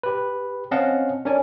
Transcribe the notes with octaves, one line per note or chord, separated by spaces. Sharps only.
G4 B4
C4 C#4 D#5 F5 F#5 A5
C#4 D4 A#4 D5 G#5